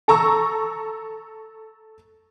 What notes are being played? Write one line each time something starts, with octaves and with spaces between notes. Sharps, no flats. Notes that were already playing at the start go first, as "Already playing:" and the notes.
A4 A#5 C#6 E6